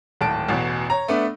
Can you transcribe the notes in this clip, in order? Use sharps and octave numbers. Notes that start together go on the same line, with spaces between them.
D1 G#1 A5 D7
A1 E2 B2
C#5 A#5
A3 B3 D4